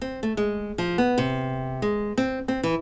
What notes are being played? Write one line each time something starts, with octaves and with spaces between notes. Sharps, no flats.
C4
A3
G#3
F3
B3
C3
G#3
C4
C4
E3